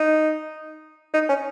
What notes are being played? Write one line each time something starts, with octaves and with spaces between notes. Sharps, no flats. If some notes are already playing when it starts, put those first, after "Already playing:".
Already playing: D#4
D#4
C#4